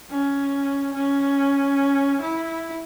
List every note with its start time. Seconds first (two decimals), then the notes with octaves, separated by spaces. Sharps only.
0.10 C#4
0.93 C#4
2.21 E4